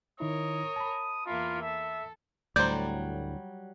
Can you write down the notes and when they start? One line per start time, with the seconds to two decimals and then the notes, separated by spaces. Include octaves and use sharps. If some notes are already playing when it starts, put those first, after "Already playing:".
0.20 D#3 D#4 E4 A#4 C#5 D#6
0.76 A5 B5
1.26 E2 A#3 E4 F4
1.62 A4 E5
2.56 D2 A2 F#3 G3 C5 D5 G6